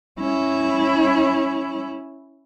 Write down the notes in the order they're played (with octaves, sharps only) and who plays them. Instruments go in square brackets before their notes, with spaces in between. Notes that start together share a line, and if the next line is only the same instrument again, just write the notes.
[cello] C#4 E4